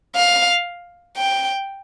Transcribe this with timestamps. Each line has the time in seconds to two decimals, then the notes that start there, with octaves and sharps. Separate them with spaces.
0.15 F5
1.18 G5